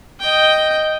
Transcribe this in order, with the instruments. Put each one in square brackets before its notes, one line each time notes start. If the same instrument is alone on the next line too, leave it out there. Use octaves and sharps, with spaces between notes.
[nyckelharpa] D#5 G5